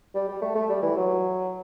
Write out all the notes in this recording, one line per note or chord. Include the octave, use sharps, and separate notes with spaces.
G3
G3
A3
A3
G3
E3
F#3